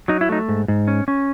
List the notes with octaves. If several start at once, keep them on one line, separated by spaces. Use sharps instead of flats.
F#3 D#4
E4
A3 D#4
G#2
G#2
C#4
C#4